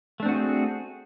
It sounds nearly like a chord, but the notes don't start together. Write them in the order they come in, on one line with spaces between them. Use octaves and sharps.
A3 D4 C4 F#4 G#4